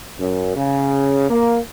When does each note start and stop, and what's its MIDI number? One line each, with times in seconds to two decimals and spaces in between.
0.20 0.55 42
0.56 1.27 49
1.29 1.58 58